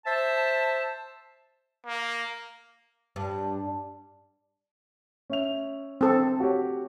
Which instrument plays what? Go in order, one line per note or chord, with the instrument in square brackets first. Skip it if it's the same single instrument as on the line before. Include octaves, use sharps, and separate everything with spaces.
[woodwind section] C5 E5 A5
[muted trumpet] A#3
[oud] G2
[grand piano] C#4 E5 F7
[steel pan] C4 A4
[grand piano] F#4 G4 C#5